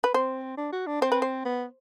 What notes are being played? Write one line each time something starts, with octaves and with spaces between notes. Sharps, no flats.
B4
C4 C5
D4
F#4
D4
C4 C5
B4
C5
B3